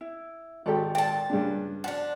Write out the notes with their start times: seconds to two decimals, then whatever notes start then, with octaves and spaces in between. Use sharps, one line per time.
0.01 E4
0.66 G#1 G4 A4 D5
0.95 A#2 G5 A5
1.30 G2 C#3 D4
1.84 F3 D4 F#5